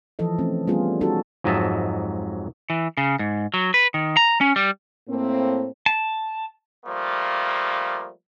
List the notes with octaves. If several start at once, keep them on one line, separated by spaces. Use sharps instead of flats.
E3 F3 A4 D#5
A3 C4 C#4
G3 A3 B3 C#4 F4 G#4
C#4 D#4 F#4 G4 A4
F2 G#2 F#3 D#5 E5 A5
E3
C#3
G#2
F#3
B4
D#3
A#5
C#4
G3
A2 A#3 C4
A5
F3 G3 A3 A#3